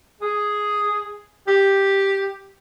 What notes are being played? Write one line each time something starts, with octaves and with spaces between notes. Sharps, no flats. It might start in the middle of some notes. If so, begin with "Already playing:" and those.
G#4
G4